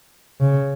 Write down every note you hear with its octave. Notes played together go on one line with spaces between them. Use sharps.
C#3